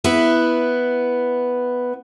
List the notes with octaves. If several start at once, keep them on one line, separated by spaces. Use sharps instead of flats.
B3 E4 B4